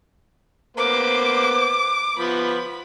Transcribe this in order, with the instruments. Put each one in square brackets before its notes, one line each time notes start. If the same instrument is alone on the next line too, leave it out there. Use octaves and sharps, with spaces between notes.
[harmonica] A#3 B3 C5 [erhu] D6
[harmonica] F3 B3 [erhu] B5